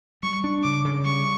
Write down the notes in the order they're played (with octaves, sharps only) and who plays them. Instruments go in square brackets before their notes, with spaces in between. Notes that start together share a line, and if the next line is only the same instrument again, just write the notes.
[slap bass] G3 [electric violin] C#6
[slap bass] D4
[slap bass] C#3 [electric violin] D6
[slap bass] C#3
[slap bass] G3 [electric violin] C#6